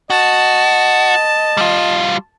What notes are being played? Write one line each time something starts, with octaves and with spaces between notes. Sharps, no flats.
F#4 D#5 A5
G3 F4